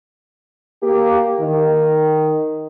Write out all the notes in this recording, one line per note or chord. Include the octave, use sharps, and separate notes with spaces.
A#3 G4
D#3